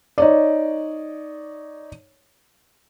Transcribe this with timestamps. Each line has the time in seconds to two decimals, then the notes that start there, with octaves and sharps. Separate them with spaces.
0.18 D#4 C#5 D5